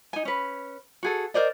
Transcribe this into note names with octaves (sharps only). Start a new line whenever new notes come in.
D#4 G#5
C#4 B4
F#4 G#4 A4
A#4 C5 D5 D#5